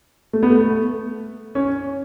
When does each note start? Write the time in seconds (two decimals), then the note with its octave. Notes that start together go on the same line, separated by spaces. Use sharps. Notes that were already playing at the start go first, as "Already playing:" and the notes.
0.33 A3
0.43 B3
0.50 A3
1.55 C#4